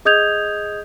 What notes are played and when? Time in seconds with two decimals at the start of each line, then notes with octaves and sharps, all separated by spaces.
0.05 G#4 D#5 D#6 G6 G#6 F7